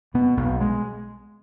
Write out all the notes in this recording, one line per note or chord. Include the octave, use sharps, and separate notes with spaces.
B2 B3
B1 B3
G#3